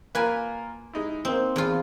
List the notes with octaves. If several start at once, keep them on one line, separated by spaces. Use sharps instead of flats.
A#3 F4 A#4 B4 G#5
G#3 D#4 E4
A#3 C4 D#4
E2 F4